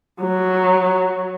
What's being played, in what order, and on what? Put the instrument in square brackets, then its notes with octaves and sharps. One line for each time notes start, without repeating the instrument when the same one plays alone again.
[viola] F#3